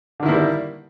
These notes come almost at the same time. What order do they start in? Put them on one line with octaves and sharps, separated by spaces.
D3 D#3 E4 A#3 G3